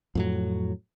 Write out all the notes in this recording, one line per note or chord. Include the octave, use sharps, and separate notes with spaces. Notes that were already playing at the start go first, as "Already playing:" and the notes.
F2 A2 F#3